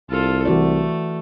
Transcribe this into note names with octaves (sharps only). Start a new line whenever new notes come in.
C2 F4 A4
E3 A3 F#4 D5